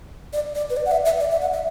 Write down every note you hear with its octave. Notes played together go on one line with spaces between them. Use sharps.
D5
D5
B4
D5
F#5
E5
E5
D5
E5
F#5
E5